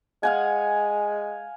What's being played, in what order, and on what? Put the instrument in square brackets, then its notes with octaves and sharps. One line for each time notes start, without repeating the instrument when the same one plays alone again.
[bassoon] G#3 [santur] F5 F#5 G#5